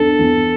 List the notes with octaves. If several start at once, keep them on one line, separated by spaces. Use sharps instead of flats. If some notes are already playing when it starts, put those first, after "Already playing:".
Already playing: E2 D4 A4
E2